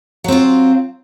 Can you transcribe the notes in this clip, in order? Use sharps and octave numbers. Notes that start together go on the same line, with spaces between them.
F#3 C4 F4